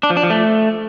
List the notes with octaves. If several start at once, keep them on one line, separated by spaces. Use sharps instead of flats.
D4
F3
D4
F3
A3